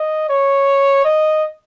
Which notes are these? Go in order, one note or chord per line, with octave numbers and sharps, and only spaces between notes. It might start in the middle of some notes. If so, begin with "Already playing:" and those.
Already playing: D#5
C#5
D#5